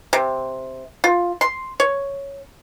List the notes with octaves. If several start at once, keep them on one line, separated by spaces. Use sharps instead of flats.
C3
F4
C6
C#5